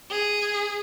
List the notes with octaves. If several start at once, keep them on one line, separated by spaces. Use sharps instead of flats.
G#4